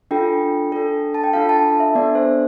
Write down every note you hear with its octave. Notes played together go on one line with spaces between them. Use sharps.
D4 F4 A4 G5
D4 A4
A5
G5
D4 F4 A4 F5
A5
A5
E5
B3 D4 A4 D5
C5